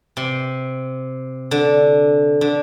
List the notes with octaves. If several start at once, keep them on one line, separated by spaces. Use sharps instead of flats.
C3
D3
D3